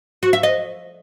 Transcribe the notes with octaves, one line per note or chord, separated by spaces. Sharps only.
F#4
E5
D#5